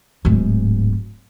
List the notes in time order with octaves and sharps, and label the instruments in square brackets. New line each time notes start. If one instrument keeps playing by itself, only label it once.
[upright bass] D1 G#2